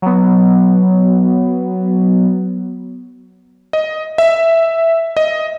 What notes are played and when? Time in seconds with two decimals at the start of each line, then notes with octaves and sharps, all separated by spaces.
0.02 F#3 B3
3.73 D#5
4.18 E5
5.17 D#5